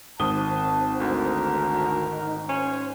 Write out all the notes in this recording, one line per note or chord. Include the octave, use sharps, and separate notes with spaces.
G#1 C4 A5 D#6 G7
D2 A#4
D#4
C#4 C5